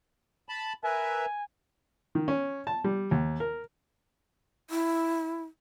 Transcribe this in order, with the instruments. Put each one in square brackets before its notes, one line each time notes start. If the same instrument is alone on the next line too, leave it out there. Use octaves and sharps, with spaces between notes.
[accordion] A5 B5
[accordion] A#4 B4 E5 [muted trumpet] G#5
[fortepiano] D#3
C#4
A5
G3
D#2
A#4
[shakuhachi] E4